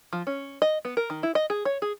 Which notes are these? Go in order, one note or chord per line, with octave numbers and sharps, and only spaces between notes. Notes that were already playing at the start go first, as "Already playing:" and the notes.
F3
C#4
D#5
B3
A#4
D#3
E4
D#5
G#4
C#5
G#4